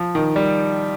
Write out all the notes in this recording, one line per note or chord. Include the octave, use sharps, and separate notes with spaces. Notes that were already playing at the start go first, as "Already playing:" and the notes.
Already playing: F3
D#3
G3